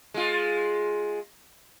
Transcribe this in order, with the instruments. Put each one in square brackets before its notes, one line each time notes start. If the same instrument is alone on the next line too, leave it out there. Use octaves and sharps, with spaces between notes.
[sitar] G#3 F4